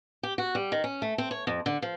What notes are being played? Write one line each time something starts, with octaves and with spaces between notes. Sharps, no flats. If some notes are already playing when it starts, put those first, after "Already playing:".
G4
F#4
G3
D#3
C#4
A3
C4
C#5
F2
D3
F3